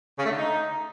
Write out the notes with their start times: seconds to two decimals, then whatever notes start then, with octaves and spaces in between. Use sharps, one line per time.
0.19 C#3
0.25 A3
0.31 D3
0.37 D#4